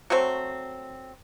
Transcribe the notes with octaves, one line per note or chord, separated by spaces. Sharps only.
F#3 A3 C4